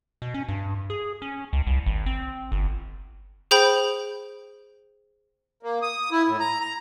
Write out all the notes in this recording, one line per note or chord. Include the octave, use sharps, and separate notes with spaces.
B2
C#4
G2
G#4
C#4
C#2
C2
G#1
C4
G1
G#4 C5 G5 B5 G6
A#3
D#6
E4
A2
A#5
A#5